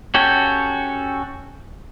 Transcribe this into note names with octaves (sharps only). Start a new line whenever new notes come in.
C#4 F#4 G4 A4 G5